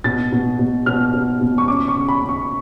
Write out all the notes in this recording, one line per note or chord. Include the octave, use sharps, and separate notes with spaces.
B2 A6
B2
B2
B2 F6
B2
B2
C#6
C#4 D6
C#6
C#3
B5
C#3
C#6